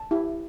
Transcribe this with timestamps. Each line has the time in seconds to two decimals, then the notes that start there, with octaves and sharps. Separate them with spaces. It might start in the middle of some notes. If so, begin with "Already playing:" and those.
Already playing: A5
0.11 E4 G4